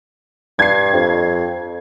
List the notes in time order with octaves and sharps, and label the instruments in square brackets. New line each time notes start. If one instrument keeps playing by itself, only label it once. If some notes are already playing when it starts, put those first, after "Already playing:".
[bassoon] G2 [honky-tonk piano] G#6 C7
[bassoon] F2